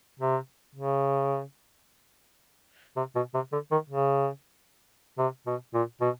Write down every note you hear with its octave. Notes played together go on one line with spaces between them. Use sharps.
C3
C#3
C3
B2
C3
D3
D#3
C#3
C3
B2
A#2
B2